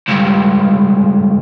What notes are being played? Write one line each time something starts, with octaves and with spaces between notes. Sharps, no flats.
C#2 G2